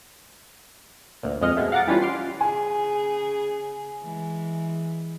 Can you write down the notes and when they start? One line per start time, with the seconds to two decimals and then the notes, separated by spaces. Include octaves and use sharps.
1.23 D2 A#2
1.41 F2 G#3 D#5 F6 C#7
1.57 B2 G#3 A3
1.72 F5 F#5 A#5 D6 A6
1.87 E3 G3 C#4 D4 F4 B4
2.01 C6 D6 F6
2.41 C#3 G#4 G#5
4.01 E3 G#3